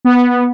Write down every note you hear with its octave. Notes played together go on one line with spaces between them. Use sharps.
B3